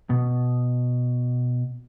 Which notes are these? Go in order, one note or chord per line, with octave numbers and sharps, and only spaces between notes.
B2